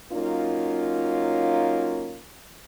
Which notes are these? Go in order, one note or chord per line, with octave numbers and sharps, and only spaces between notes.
F#3 A#3 C#4 D#4 F4